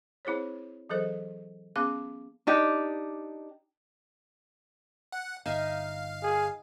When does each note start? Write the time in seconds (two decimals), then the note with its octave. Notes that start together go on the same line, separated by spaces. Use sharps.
0.25 C4 E4 G#4 C5 C#5
0.90 E3 F#3 G#4 A4 C5 D#5
1.76 B3 C#4 G#4 F5 D6
2.47 D4 D#4 G4
5.12 F#5
5.46 G1 D#4 E5 F5 G#5
6.23 G#4